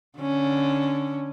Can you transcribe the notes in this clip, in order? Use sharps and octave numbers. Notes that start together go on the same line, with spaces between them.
D3 C#4